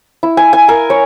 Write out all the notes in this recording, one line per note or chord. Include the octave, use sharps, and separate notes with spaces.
E4
G#5
G#5
A#4
C#5